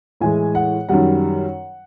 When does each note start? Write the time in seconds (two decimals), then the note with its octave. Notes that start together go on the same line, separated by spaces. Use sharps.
0.21 A2 E3 G#3 G#5
0.55 F#5
0.89 F#2 D#3 G3 F#5